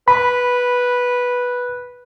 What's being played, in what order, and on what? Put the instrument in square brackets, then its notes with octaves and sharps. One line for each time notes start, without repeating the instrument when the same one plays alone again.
[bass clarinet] B4 [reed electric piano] B5